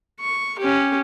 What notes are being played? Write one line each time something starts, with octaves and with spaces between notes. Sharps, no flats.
C#6
C#4 G4